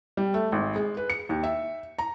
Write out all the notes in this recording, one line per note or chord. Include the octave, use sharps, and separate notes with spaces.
G3
A3
G#1
G#3
B4
C#7
D#2
E5
A#5